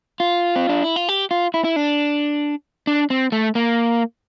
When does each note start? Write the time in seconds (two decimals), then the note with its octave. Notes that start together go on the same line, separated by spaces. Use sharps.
0.20 F4
0.56 C4
0.69 D4
0.82 E4
0.96 F4
1.09 G4
1.31 F4
1.54 E4
1.64 E4
1.76 D4
2.87 D4
3.10 C4
3.32 A3
3.55 A#3